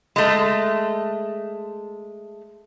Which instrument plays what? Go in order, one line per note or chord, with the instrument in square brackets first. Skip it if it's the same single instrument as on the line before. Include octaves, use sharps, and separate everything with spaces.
[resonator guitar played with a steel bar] G#3 A3